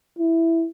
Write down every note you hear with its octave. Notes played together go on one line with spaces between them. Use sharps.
E4